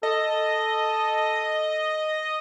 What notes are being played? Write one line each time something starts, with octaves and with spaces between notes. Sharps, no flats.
A4 D#5